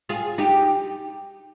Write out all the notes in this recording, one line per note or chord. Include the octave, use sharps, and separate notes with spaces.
F4 G#4
D#4 G4